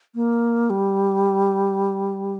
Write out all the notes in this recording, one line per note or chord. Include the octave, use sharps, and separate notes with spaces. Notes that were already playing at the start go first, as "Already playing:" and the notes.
A#3
G3